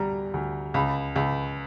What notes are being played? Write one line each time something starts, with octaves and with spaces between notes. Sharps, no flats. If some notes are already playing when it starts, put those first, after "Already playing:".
Already playing: D2 G3 A#5
D2
C#2 B5
C#2